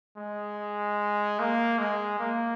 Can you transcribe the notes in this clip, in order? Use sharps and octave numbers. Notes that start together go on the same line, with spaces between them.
G#3
A#3
G#3
A#3